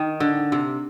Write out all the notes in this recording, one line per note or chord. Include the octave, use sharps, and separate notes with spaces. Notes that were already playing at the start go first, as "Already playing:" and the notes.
Already playing: D#3
D3
C3